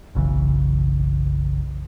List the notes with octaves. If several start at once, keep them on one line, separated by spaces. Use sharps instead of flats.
F#1 B1 C#3 E3